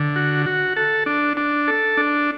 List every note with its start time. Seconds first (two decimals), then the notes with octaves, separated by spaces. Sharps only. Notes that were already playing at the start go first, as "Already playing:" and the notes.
Already playing: D3
0.16 F#4
0.46 F#4
0.76 A4
1.06 D4
1.37 D4
1.68 A4
1.97 D4